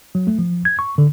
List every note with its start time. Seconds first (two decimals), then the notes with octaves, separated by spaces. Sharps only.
0.15 F#3
0.27 A3
0.39 F3
0.65 G#6
0.79 C#6
0.98 D3